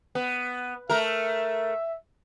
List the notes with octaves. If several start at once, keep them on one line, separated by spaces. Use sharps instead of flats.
B3
A3 A#4 E5